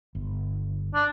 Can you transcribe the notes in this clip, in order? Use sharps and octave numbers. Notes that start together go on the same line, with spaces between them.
G1
D4